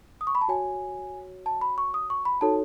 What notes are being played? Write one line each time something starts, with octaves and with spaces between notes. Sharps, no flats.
D#6
C#6
B5
A5
F#4 C#5 G#5
A5
B5
C#6
D#6
C#6
B5
D#4 F#4 A4 C#5 A5